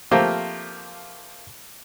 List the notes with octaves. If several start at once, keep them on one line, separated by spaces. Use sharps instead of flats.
F3 A3 A#3 C4 G4 A#4